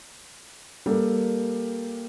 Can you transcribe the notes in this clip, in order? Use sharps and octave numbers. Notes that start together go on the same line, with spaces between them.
G3 A#3 G4 A4 A#4